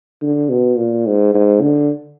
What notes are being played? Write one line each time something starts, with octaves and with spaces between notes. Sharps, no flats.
D3
B2
A#2
G#2
G#2
D3